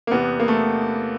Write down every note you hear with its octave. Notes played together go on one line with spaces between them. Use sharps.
A#3
E2 C3 E3 B3
A#3
A3